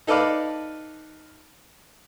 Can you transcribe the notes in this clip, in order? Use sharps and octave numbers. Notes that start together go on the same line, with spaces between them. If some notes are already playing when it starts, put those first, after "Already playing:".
D#4 A4 B4 D5 F5